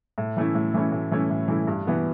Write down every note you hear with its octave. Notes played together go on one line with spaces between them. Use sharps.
A2
E3 A3 C#4 E4
A2
E3 A3 C#4 E4
A2
E3 A3 C#4 E4
A2
E3 A3 C#4 E4
G2
E3 B3 E4